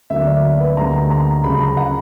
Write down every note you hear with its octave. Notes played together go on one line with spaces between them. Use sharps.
D2 D3 F#3 A#3 E5
D5
B4
D2 D3 G3 A#3 A#5
A#5
C#2 C#3 F#3 B5
A#5
F#5